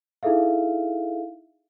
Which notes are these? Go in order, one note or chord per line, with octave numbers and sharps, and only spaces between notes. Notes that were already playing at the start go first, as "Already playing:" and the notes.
D#4 E4 G#4 A4 E5 F5